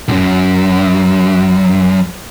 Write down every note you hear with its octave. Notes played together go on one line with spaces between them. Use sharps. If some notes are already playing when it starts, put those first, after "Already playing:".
B1 F#2